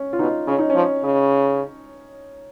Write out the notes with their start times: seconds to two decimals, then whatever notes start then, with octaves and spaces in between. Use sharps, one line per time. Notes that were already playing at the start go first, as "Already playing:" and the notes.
Already playing: C#4
0.13 F4
0.19 B2 D#4
0.47 C#3 C#4
0.59 D#4
0.70 F3 C#4
1.04 C#3